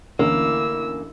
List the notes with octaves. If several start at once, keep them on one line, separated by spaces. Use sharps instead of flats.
A1 D2 A#3 C#4 E4 E6